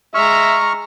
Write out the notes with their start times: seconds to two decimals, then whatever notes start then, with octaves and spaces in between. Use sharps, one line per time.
0.14 G#3 E5 A#5 C#6 F6